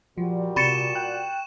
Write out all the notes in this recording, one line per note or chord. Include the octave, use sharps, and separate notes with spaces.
A#2 F3 G3 F#4
C3 B5 C#6 A6 C#7 D#7 E7
G5 F#6